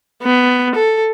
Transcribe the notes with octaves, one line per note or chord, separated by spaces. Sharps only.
B3
A4